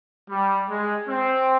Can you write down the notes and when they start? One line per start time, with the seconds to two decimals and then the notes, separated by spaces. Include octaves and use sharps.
0.30 G3
0.68 G#3
1.07 C4